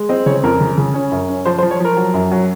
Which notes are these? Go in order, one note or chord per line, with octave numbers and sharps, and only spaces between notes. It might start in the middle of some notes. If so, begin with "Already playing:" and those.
Already playing: G#3
C4 D#5
C#3 C#5
F2 A#4
C#3
C#3
C#4
F#2
C#4
F3 C5
C5
F3
C#5
F3 A#4
F#3
F#2
F#3